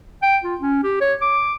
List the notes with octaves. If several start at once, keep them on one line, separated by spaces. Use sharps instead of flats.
G5
F4
C#4
G4
C#5
D6